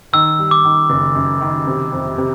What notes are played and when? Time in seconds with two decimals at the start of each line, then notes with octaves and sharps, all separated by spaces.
0.13 D#3 E6
0.39 G3
0.51 D6
0.64 D#3
0.90 F#1
1.15 F#2
1.41 D#3
1.67 C3
1.92 F2
2.18 C3